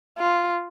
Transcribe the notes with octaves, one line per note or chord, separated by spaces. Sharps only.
F4